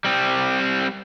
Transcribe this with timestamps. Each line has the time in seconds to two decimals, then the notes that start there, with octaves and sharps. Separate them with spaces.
0.04 G3 C4